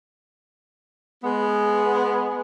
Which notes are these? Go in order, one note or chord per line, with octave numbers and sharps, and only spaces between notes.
G#3 B3